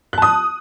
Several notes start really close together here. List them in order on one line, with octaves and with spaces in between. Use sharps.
F#6 A5 D#6